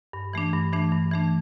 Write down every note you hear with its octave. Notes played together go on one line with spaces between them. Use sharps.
G2
E3 A3 D4
G2
E3 A3 D4
G2
E3 A3 D4